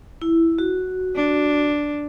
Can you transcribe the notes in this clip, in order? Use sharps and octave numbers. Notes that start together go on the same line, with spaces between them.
E4
F#4
D4